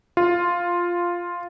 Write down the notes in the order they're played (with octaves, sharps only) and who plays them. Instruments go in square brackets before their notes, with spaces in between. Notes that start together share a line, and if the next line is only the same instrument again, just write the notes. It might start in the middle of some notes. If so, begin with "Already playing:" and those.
[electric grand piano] F4